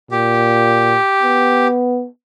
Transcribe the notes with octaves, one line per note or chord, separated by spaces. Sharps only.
A#2 G4
B3